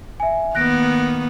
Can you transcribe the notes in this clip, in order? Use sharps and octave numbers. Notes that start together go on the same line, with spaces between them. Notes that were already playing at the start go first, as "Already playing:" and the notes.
E5 G#5
D#3 A#3 B3 F#6 A#6 D7